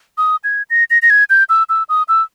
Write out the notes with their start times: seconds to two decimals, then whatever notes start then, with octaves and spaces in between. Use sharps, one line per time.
0.18 D#6
0.44 G#6
0.70 A#6
0.90 A#6
1.02 A#6
1.10 G#6
1.30 G6
1.49 E6
1.69 E6
1.89 D#6
2.08 E6